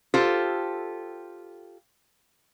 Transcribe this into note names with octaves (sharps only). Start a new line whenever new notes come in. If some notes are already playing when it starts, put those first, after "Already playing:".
F4 G4 A4 C5